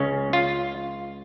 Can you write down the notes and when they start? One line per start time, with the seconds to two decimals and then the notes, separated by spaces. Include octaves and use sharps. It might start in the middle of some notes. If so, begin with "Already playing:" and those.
Already playing: C#2 C#3 C#4
0.33 F4